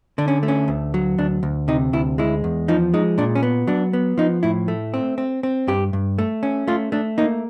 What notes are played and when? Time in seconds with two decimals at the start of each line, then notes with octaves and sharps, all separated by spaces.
0.18 D3 D4
0.28 C#4
0.43 A3
0.48 C#4
0.68 D2
0.94 F#3
1.18 D2 D4
1.43 D2
1.68 C3 D#4
1.93 D2 E4
2.18 G#3 E4
2.44 E2
2.68 F3 D#4
2.94 G#3 D#4
3.18 A#2 D4
3.35 C#4
3.43 B3
3.67 F#3 D4
3.93 B3
4.18 F3 D#4
4.43 A2 E4
4.68 A3
4.94 C4
5.18 C4
5.43 C4
5.67 G2 G4
5.93 G2
6.18 A3
6.43 C#4
6.68 A3 F4
6.92 A3 D4
7.18 A#3 D#4